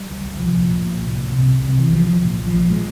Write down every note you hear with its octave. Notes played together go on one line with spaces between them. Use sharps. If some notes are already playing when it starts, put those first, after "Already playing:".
Already playing: G3
C#2
C#2
C2 F3
A#2
A#2
A#2
C2
A#2
C3
C2
C3
C2 E3
C2 F3
C2 F3
A#2
A#1
F3
A#2
G#3